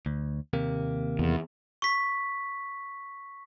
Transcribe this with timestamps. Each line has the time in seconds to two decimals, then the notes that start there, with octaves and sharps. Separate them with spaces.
0.06 D2
0.53 D#2 C3 A#3
1.19 E2
1.82 C#6 B6